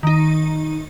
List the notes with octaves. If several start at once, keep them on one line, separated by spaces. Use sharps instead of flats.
D#3 D#4